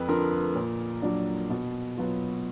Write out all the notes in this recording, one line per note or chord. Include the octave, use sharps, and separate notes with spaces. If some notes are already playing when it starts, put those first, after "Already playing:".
Already playing: F2 B4
D3 F3 A#4
A#2
F#3 D4
B2
F#3 B3 F4